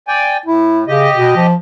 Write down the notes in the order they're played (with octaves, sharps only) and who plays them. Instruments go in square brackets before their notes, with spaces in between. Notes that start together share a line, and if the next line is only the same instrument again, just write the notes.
[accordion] D5 G5 G#5
[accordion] A2 [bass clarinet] E4
[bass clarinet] C#3 [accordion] G4 D#5
[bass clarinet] B2
F3